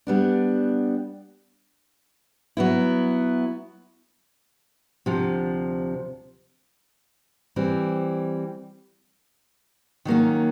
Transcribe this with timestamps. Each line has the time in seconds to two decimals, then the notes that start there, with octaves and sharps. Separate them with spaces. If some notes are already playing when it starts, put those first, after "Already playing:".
0.07 G3 B3 D4
2.57 F#3 B3 E4
5.06 D2 C3 F3
7.56 E3 G3 C4
10.05 D#3 F#3 A#3 C#4